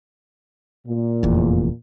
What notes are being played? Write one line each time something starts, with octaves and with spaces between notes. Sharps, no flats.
A#2
F1 E2